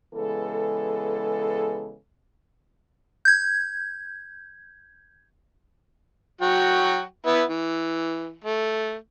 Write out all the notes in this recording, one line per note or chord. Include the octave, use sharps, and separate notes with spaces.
C#3 E3 G#3 B3 A4
G6 G#6
F#3 F#4 G5
B3 E4
E3
A3